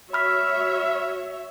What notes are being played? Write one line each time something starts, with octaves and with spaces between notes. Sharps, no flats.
F#4 C#5 E5 B5 F6 B6